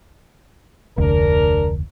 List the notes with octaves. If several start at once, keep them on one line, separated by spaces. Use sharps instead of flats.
F1 D2 D4 A#4